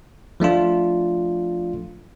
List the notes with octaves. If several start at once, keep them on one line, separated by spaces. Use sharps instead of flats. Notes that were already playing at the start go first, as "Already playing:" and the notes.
F3 A3 D4 F4